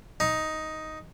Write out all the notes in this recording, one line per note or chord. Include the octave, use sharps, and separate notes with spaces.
D#4